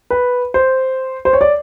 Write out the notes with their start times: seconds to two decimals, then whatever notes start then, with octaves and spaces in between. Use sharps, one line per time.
0.10 B4
0.54 C5
1.25 C5
1.33 C#5
1.41 D5